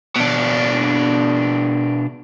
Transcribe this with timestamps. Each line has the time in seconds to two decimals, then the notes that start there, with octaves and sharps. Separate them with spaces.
0.16 B2 D4